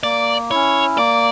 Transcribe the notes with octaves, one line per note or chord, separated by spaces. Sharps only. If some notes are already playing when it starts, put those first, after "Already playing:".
A#3 D5
C#4 E4 C#5
A#3 D5